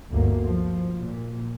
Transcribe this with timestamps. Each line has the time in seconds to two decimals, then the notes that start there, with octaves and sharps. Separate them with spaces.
0.12 G1 D2 A#3
0.47 F3
1.00 A#2